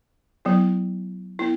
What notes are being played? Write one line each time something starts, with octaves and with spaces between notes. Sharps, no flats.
F#3 B3 E4
B3 E4